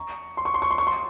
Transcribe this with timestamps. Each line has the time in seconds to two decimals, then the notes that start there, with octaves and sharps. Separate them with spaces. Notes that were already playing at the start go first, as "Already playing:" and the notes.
Already playing: A#5 C#6
0.37 C6
0.45 C#6
0.54 C6
0.62 C#6
0.71 C6
0.78 C#6
0.87 C6